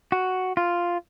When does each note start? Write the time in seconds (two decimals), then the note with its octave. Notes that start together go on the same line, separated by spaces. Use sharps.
0.12 F#4
0.57 F4